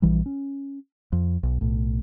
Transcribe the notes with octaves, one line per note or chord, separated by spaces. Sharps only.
A#1 E3 G3
C#4
F2
B1
B1 A2